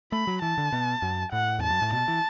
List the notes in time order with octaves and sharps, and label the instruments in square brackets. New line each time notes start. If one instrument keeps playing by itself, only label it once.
[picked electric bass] A3 [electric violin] B5
[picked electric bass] F#3
[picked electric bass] E3 [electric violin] A5
[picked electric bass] D3
B2
F#2
[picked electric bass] A2 [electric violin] F#5
[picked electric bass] E2 [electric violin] A5
[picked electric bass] F#2
A2
[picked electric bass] B2 [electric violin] A5
[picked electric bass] E3